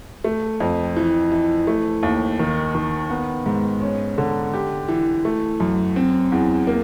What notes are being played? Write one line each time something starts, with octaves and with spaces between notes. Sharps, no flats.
A3
F2
E3
E3
A3
D#2
D#3
D#3
B3
G#2
C#4
D3
G4
E3
A3
F#2
C4
E2
A#3